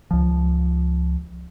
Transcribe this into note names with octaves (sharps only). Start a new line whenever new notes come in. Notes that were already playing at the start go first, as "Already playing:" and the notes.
C#2 F3